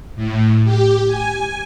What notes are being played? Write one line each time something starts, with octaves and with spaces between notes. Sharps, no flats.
A2
G4
G#5